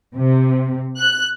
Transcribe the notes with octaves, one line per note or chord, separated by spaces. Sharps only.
C3
F#6